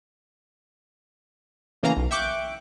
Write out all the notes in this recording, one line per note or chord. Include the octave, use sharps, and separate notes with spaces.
A2 C#3 E3 A#3 F5 A#5
B1
E5 G5 C#6 D6 F#6 G6